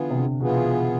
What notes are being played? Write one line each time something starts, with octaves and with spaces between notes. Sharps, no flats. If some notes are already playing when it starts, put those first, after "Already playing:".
Already playing: D3 E3 B3 F4 G#4
C3
D3
B2 E3 B3 F4 G#4